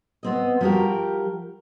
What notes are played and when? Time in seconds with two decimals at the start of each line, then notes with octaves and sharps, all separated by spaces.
0.23 B3 C4 D#5
0.61 F3 G3 F#4 G4 A#4